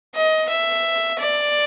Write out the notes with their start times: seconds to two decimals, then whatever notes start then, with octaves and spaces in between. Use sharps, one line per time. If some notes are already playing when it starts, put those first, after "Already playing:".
0.15 D#5
0.49 E5
1.19 D5